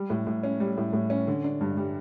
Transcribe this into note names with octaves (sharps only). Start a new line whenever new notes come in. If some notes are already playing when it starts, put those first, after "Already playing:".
Already playing: G3
A2
A2
C#4
G3
A2
A2
C#4
D3
D4
G2
G3